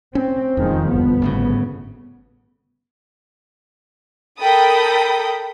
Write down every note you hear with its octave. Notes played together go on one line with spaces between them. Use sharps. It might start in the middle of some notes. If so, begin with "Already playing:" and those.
C4 C#4
E1 F2 D#3 F3 G#3
G1 B3
G#1 A2 C#3
A4 A#4 G5 B5 D#6